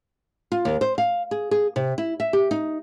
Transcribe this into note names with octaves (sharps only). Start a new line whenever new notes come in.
F4
D#2
C5
F5
G#4
G#4
C3
E4
E5
G4
D#4